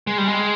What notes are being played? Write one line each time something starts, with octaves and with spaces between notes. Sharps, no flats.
G#3
G3
G#3